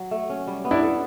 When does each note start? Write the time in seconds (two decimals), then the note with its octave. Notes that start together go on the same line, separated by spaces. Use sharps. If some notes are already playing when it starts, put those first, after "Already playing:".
Already playing: F#3
0.11 A3
0.30 C#4
0.47 G3
0.65 B3
0.71 D4 E4
0.83 A4